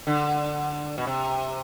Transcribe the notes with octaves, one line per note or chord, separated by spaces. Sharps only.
D3
B2
C3